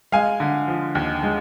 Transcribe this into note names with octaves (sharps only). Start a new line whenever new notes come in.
G#3 F5 G#5
D3
F3
D#2
G#3